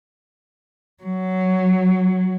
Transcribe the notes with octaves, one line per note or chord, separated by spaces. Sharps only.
F#3